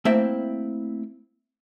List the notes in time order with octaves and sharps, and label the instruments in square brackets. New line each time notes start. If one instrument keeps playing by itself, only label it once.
[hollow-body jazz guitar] A3 A#3 C4 E4 E5 G5